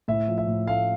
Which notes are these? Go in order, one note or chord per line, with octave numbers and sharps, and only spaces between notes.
A2 E5
F3
E5
A2
A3 F5